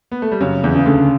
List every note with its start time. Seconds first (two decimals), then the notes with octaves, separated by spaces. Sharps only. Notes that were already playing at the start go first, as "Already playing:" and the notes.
0.11 B3
0.22 A3
0.31 G3
0.41 F#2 C#3 F#3
0.64 E2 E3
0.75 C#3
0.86 D2 D3